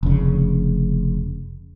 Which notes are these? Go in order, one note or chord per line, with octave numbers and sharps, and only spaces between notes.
F1 C#3